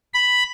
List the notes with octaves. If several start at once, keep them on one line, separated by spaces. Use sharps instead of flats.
B5